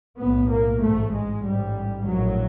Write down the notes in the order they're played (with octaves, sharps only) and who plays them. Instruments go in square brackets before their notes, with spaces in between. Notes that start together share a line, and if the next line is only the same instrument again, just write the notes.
[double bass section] B1 A2 B3
A#3
A1 G#2 A3
G#3
A1 G#2 G3
A#1 A2 F#3